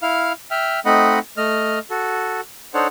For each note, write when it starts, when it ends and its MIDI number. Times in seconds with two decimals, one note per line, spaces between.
0.03 0.33 64
0.03 0.33 77
0.03 0.33 89
0.51 0.80 76
0.51 0.80 79
0.51 0.80 89
0.85 1.19 57
0.85 1.19 60
0.85 1.19 63
0.85 1.19 75
0.85 1.19 78
0.85 1.19 83
1.37 1.79 57
1.37 1.79 75
1.37 1.79 89
1.90 2.41 66
1.90 2.41 69
2.74 2.87 62
2.74 2.87 63
2.74 2.87 69
2.74 2.87 72
2.74 2.87 73
2.74 2.87 78